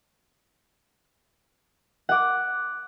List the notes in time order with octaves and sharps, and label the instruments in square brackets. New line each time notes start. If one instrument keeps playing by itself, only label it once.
[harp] F#5 D6